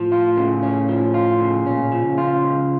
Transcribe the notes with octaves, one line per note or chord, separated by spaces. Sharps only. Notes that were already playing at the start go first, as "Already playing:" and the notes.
Already playing: A2 F3
F4
C#3
C#4
F3
F4
C#3
A#2 C#4
F3
C#3
F4
C#2